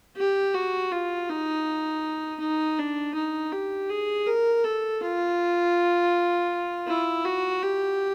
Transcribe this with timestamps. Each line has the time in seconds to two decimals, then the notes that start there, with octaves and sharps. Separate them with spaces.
0.17 G4
0.54 F#4
0.92 F4
1.29 D#4
2.40 D#4
2.78 D4
3.14 D#4
3.52 G4
3.90 G#4
4.27 A#4
4.65 A4
5.02 F4
6.87 E4
7.24 F#4
7.62 G4